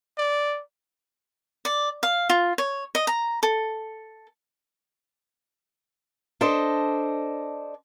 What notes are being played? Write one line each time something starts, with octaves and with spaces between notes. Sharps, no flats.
D5
D5
F5
F4
C#5
D#5
A#5
A4
D4 A4 C5 D#5